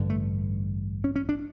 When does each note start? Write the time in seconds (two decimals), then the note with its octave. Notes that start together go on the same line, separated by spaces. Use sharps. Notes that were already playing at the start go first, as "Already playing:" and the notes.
Already playing: A1 G2 D3
0.10 A3
1.04 C#4
1.16 C#4
1.29 D4